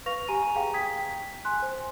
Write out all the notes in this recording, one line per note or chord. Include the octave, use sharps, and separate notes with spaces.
B4 F5 C#6 A#6 F7
G4 G#5 A#5 D#7
G#4 F5 G5 A#5
G5 D#6 G#6 B6
G#5 C6 F#6
C5